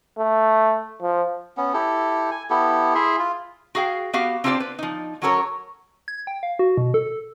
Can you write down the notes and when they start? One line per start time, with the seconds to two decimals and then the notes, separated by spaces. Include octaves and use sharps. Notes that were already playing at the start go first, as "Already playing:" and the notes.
0.19 A3
1.02 F3
1.57 B3 C#4
1.74 E4 G4 A4
2.31 G#5
2.50 B3 E4 G4 A4
2.95 E4 G#4 E5 C6
3.19 F4
3.75 F#4 G#4 F5 G5
4.13 B3 F#4 G4 F5
4.44 C4 D4 F4 G4 C5 D5
4.60 B4
4.79 F3 D#4
5.22 F#3 C#4 F#4 A4 A#4 C#5
6.08 G#6
6.27 G5
6.43 F5
6.59 F#4
6.78 B2
6.94 A4